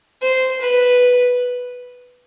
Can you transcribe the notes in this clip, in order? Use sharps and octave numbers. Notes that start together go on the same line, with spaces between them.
C5
B4